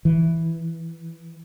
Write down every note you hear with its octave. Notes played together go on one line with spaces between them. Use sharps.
E3